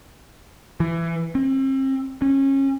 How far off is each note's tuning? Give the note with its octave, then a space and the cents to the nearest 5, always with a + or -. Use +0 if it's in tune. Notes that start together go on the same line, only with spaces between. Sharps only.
E3 +20
C4 +40
C#4 -25